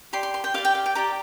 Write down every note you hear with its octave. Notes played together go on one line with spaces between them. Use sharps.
G4 D5 C6
C6
C6
G5
G4 D5 F5
G5
F5
G5
G4 D5 A#5